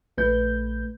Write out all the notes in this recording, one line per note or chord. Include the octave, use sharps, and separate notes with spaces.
A#1 A3 B4 G6